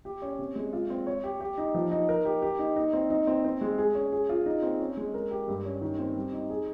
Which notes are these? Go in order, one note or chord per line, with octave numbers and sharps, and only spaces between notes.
G4
C#4
C3
G#3
F4
C4
C#5
G4
G4
D#4
F3
D#4
A#4
G4
G4
D#4
D#4
C4
D#4
C4
C4
G#3
G#4
C#4
G#4
F4
D#4
C4
C#4
G#3
A#4
G4
G2
C#4
D#3
C4
G3
D#4
G#4